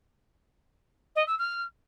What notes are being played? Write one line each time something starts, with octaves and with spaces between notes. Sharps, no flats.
D#5
E6
F6